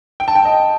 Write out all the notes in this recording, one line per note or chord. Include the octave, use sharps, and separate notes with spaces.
G5
A5
G5
D#5